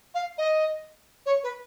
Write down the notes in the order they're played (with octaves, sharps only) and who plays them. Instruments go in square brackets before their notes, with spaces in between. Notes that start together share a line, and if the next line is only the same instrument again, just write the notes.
[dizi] F5
D#5
C#5
B4